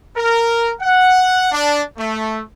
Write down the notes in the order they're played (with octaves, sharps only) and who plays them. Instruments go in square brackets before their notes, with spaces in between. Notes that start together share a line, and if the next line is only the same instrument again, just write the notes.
[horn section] A#4
F#5
D4
A3